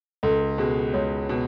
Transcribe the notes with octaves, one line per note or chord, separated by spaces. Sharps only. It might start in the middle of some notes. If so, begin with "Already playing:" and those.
C#2 A4
B2 G#3 G#4
C#2 C#5
B2